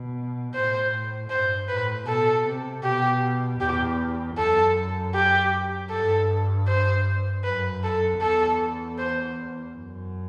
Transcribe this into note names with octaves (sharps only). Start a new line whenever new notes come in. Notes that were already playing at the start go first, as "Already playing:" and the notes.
Already playing: B2
A2 C5
G2 C5
A2 B4
B2 A4
C3
B2 G4
E2 G4
F#2 A4
G4
G2 A4
C5
F#2 B4
A4
E2 A4
C5
F#2